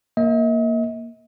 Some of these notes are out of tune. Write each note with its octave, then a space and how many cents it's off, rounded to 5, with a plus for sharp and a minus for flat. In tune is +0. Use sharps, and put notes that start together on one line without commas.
A#3 +0 D#5 +45